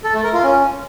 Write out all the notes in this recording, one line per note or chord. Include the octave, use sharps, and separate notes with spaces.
A4
A3
A#4
F4
C#4